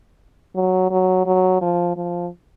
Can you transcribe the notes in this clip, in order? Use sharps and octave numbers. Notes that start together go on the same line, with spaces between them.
F#3
F#3
F#3
F3
F3